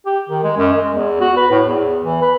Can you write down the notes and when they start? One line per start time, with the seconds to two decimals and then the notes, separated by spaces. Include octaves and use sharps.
0.06 G4
0.29 D#3
0.44 G#3
0.57 F#2
0.73 G#3
0.94 E2
1.20 F#4
1.37 B4
1.51 A2
1.65 E2
2.04 E3
2.22 B4